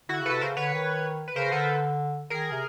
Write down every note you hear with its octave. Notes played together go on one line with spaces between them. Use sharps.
D3 E4 F#4
C#3
A4 B4
C3
C#3 A#4 C5
D3 B4 C#5
D#3
B4
C#3 A#4 C5
D3 A4 B4
D#3 G#4 A#4
C3